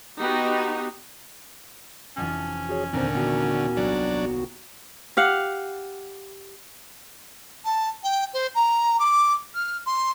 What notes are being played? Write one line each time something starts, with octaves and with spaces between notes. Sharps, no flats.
B3 D#4 F#4 G4
F1 F2 E3 C#4
F#4 G#4 C#5
D#2 A#2 D3 C4 A#4 C5
D#1 B3 F#4
C2 F#3 D4
G4 F5 F#5
A5
G5
C5
A#5
D6
F6
C6